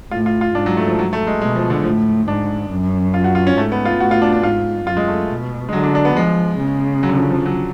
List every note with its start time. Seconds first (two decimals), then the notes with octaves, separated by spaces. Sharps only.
0.11 A2 F4
0.26 F4
0.41 F4
0.55 G#2 D4
0.66 F#3
0.77 A3
0.87 F3
0.99 F#3
1.13 A3
1.27 G#3
1.41 B2 G#3
1.56 F3
1.70 D3
1.84 A2 F3
2.28 G#2 D4
2.71 F#2
3.14 F4
3.24 F#4
3.35 F4
3.47 C#4
3.57 G#2 A3
3.72 B3
3.85 F4
4.00 A2 F#4
4.11 F4
4.22 D4
4.32 D4
4.43 G#2 F4
4.86 F#2 F4
4.97 G#3
5.08 A3
5.30 B2
5.69 G#3
5.73 D3 F#3
5.84 D4
5.95 D4
6.05 B3
6.16 F3 G#3
6.59 C#3
7.03 F#3
7.09 D3
7.16 F3
7.31 F3
7.46 F#3